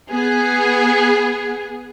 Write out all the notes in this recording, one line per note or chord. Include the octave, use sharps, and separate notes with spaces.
B3 G#4